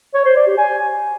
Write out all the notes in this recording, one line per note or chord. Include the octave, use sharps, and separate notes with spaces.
C#5
C5
D5
G4
G#5